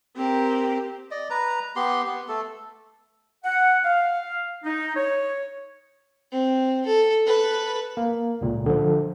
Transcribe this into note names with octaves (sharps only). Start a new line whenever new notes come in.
C4 G4 A#4
D5 D#5
B4 A#5
B3 G4 C6
B3
A3 A4
F#5
F5
D#4
C#5
C4
A4
A4 B4
A#3
C#2 A#2
D3 F3